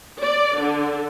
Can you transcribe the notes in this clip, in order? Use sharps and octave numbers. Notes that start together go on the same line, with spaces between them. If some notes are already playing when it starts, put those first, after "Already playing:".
D5
D3